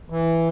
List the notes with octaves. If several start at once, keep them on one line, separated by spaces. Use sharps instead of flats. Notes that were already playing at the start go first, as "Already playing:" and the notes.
E3